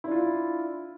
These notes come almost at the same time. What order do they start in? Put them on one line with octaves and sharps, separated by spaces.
E4 D4 F4